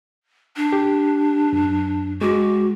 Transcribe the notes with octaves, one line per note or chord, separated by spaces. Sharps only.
D4
G4
F#2
G#3 F#4 D6